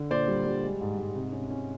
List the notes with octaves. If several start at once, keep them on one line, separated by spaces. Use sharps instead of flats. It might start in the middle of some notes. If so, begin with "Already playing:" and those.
Already playing: D3
A#2 C5 D5
G3
G3
G#3
G#2
G#2
C3
C#4
C#4